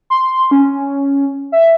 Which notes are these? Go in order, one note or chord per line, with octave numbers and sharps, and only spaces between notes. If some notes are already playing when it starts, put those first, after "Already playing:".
C6
C#4
E5